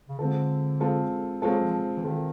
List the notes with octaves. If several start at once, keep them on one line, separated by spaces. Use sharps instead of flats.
C#3
D3 G#3 C4 F4 A4
G#3 C4 F4 A4
F#3 G#3 C4 F4 A4
F3
E3
D#3 G#3 C4 F4 A4